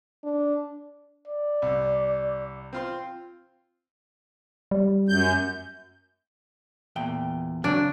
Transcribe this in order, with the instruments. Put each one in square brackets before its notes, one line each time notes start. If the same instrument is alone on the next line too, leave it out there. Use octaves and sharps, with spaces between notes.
[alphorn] D4
[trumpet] D5
[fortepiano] C2
C4 F4 C6
[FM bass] G3
[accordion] F#2 G6
[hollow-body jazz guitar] E2 A#2 G5
[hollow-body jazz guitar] C#3 F#3 C4 [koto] D4